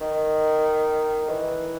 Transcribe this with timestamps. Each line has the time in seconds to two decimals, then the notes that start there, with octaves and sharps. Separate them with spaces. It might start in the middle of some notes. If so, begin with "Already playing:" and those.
0.01 D#3
1.29 E3